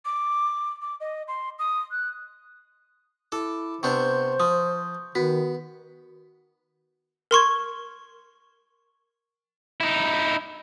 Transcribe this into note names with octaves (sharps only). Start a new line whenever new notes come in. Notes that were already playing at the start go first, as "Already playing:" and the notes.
D6
D6
D#5
C6
D#6
F#6
E4 A4 D6
C3 B3 D4 C5 C#6 G6
F3 D#6
D#3 B3 F#4
A#4 C6 C#6 G#6
D#4 E4